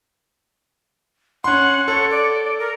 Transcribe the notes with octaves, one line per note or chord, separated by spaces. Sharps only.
C#4 F#5 C6
A4 C#5
D5
A#4